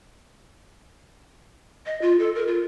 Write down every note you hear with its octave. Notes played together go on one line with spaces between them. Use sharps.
D#5
F4
A4
A#4
F4